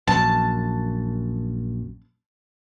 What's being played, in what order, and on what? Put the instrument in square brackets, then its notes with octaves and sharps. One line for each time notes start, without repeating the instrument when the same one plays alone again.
[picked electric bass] A#1 F#2 [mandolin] A5